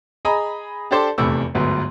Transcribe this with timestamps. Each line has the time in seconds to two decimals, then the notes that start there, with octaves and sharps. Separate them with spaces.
0.25 G#4 D#5 G#5 A#5 B5 D#6
0.91 D4 G4 A4 C5 D5 A5
1.18 F1 E2 C3 A3 B5 E6
1.55 G1 D2 G#2 F#3 B3